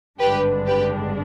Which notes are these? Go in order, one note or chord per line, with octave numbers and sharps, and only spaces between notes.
G#1 G2 D3 G#3 D4 G4 B4
G4 B4